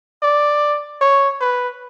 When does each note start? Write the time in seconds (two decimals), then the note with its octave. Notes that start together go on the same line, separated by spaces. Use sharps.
0.23 D5
1.01 C#5
1.41 B4